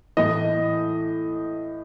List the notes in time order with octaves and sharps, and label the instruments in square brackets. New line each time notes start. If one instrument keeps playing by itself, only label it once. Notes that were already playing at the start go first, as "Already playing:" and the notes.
[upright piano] A2 E3 D#5